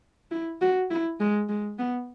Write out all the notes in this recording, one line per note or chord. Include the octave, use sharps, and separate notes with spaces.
E4
F#4
E4
G#3
G#3
B3